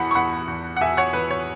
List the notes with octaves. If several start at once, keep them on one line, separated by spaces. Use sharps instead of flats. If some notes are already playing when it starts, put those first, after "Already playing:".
Already playing: E2 E3 F#5 B5
C#6
E2 F#5 B5
E2
F#5
E2 E5 G#5
C#5 F#5
E2 B4
C#5